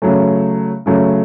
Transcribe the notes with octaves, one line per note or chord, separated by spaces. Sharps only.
C#3 F#3 A3
C#3 F#3 A3